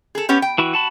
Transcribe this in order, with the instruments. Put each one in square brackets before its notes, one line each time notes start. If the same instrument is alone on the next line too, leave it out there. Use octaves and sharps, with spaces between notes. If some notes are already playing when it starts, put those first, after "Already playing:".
[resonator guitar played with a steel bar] G#4 A4
B3 C#4 G4
G5
[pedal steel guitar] E3 E4 F#4
F#4 A5 B5